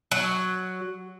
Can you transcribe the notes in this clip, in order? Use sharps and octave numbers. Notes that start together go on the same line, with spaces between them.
F#3